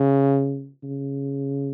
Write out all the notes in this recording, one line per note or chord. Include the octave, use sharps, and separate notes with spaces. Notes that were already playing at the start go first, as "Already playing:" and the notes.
Already playing: C#3
C#3